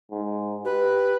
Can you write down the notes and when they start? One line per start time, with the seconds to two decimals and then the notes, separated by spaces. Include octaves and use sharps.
0.11 G#2
0.65 G4 B4